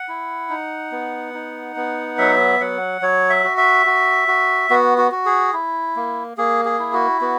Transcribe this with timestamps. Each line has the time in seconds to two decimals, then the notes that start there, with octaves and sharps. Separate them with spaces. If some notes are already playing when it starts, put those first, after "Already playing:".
Already playing: F#5
0.08 E4
0.50 D#4
0.92 B3
1.34 D#4
1.76 B3
2.18 F#3 E5
2.60 F#3 F#5
3.01 F#3 C#5
3.30 E5
3.44 F#4
3.57 E5
3.86 F#4
4.28 F#4
4.70 B3 F#4
4.98 F#4
5.11 F#4
5.26 G#4
5.53 E4
5.96 A#3
6.37 A#3 G#4
6.65 G#4
6.79 E4
6.93 F#4
7.21 B3 F#4